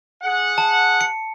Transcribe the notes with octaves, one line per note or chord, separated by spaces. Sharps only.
G#4 F#5
A5
C#7